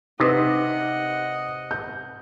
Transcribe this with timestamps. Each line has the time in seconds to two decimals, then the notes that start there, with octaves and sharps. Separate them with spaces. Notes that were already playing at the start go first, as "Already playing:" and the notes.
0.20 C3 D#4 B4 D#5 F#5 D#6
1.71 G6